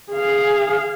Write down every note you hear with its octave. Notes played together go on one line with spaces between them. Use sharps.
G#4 F5